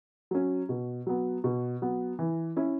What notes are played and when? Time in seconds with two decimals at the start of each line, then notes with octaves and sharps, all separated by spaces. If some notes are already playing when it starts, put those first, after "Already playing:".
0.31 F#3 C#4
0.69 B2
1.07 F#3 B3
1.44 B2
1.82 F#3 B3
2.19 E3
2.57 C#4 E4